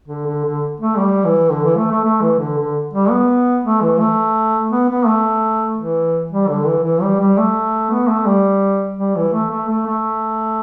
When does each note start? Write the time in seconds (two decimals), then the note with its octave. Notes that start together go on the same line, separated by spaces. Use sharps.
0.08 D3
0.26 D3
0.44 D3
0.80 A3
0.97 G3
1.25 E3
1.51 D3
1.64 E3
1.77 A3
1.91 A3
2.04 A3
2.21 E3
2.39 D3
2.58 D3
2.93 G3
3.10 B3
3.64 A3
3.82 E3
3.99 A3
4.71 B3
4.89 B3
5.06 A3
5.77 E3
6.31 G3
6.49 D3
6.66 E3
6.84 E3
7.02 G3
7.20 G3
7.38 A3
7.90 B3
8.08 A3
8.26 G3
8.97 G3
9.16 E3
9.33 A3
9.51 A3
9.68 A3
9.87 A3